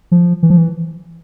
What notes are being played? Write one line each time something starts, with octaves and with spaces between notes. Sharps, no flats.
F3
E3
F3
E3